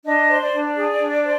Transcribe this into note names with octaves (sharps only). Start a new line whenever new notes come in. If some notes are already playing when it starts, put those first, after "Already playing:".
D4 D#5
C5
D5
D4
G#4
D4
C5